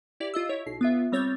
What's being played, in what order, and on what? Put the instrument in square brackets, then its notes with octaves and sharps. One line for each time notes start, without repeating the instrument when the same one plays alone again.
[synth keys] E4 G4 D5
F4 D#5 E6
E4 C#5
B1 C7
B3 F4 E5
G3 C4 C#5 G6 A6